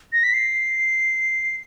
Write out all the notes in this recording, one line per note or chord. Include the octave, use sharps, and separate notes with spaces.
A#6
B6
C7